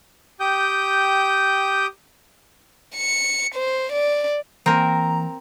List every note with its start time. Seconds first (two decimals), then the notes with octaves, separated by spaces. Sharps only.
0.40 G4 G5 D#6 G6
2.96 C#7
3.55 C5
3.93 D5
4.66 E3 A#3 C4 A#4 G#5 A#5